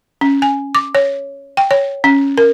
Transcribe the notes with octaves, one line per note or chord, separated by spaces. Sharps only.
C#4
G#5
D6
C#5
G5
C#5
C#4
A#4